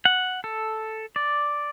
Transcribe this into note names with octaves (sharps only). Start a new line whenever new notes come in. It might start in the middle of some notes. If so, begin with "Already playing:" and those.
F#5
A4
D5